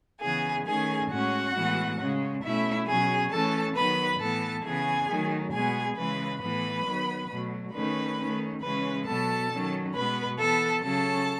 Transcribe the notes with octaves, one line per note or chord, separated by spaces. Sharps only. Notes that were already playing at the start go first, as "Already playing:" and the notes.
C#3 E3 B3 G#4 G#5
D#3 A3 C#4 G#4 G#5
A2 G#3 C#4 F#4 F#5
A2 E3 G#3 B3
C#3 G#3 C#4
B2 A3 C#4 E4 E5
B2 F#3 C#4 G#4 G#5
E3 A3 C#4 A4 A5
D#3 F#3 B3 B4 B5
A2 E3 B3 A4 A5
C#3 E3 B3 G#4 G#5
D#3 F#3 A3
B2 G#3 B3 G#4 G#5
C#3 E3 G#3 B4 B5
A2 E3 B3 B4 B5
D#3 F#3 B3
B2 F#3 A3
D#3 A3 C#4 B4 B5
D#3 A3 C#4
C#3 E3 G#3 C#4 B4 B5
B2 F#3 B3 A4 A5
D#3 F#3 C#4
B2 G#3 B3 B4 B5
E3 B3 A4 A5
C#3 F#3 C#4 A4 A5